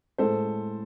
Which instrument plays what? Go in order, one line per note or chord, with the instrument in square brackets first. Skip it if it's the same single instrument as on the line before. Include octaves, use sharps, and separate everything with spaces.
[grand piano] A2 G#3 A4 C5